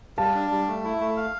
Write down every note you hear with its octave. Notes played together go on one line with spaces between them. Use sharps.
G3 F5 A5
D4
G3
A3
E4
A3
F5